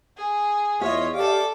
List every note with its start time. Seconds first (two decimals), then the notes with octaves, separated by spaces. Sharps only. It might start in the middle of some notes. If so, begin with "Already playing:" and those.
0.17 G#4
0.81 E2 F4 C#5 D#5 E5
1.14 G4 A4 D5 F5 D6